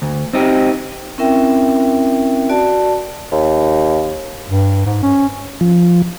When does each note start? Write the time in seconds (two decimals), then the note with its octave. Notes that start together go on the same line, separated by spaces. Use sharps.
0.02 D2
0.33 C4 D#4 G4
1.18 C4 C#4 E4 A#4 E5 G5
2.49 F#4 D5 A5
3.32 D#2
4.48 G2
4.86 G#2
5.03 C#4
5.61 F3